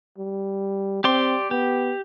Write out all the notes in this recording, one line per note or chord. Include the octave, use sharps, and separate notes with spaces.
G3
C4 G4 D5 C6
B3 G4